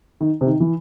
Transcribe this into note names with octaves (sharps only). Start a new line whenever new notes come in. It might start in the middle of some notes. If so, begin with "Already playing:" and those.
D#3
C3
D#3
E3